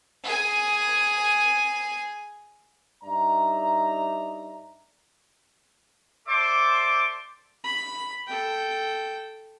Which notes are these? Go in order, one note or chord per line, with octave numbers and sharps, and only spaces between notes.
G#4 G#5
G2 D#4 D5 E5 A#5
A4 C5 D5 E5 C6 D6
B5
A4 G5